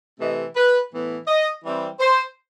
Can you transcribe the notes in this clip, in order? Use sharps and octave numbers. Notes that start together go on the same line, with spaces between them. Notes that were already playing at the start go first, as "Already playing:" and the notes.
C3 E3 A3 D#5
B4
A2 E3 B3
D#5
E3 G3 C4
C5